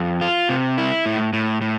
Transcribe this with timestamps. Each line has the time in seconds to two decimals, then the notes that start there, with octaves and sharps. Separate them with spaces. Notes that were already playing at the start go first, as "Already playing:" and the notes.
Already playing: F2
0.21 F4
0.49 C3
0.78 E4
1.06 A2
1.33 A2
1.61 A2